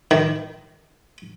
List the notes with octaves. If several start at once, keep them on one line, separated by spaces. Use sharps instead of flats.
D#3